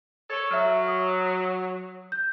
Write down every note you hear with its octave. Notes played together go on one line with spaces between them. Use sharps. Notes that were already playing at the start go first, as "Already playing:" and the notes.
A4 C#5
F#3 E5 F6
D#6
G6